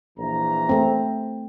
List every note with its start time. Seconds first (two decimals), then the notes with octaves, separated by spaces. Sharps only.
0.18 A#1 E3 A#5
0.69 A3 C4